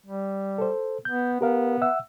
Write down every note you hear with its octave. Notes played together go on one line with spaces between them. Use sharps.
G3
A4 C5
B3 G6
B3 G4 A#4 F5
E5 F#5 E6